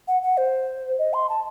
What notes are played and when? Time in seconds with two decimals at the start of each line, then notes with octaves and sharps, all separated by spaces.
0.08 F#5
0.23 F#5
0.37 C5
0.99 D#5
1.14 C6
1.30 A5